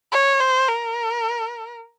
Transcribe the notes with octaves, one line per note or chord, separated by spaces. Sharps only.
C#5
C5
A#4